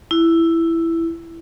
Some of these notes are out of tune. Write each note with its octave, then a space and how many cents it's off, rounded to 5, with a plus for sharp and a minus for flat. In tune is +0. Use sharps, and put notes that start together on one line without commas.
E4 +5